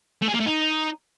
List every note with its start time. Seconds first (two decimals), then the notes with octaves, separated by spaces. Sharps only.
0.22 A3
0.28 G#4
0.34 A#3
0.40 A3
0.46 D#4